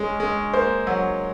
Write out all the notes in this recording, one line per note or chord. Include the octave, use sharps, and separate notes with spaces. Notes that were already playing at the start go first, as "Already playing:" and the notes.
Already playing: G#3 C#4
G#3
A#3 C5
F#3